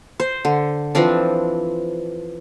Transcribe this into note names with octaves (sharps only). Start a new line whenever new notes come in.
C5
D3
E3 F3 C4 D4